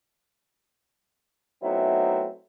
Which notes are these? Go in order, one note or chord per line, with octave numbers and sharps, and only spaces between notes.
F#3 A3 B3 C4 D#4 E4